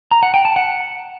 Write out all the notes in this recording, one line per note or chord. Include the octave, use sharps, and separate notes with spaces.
A#5
F#5
G5
A5
F#5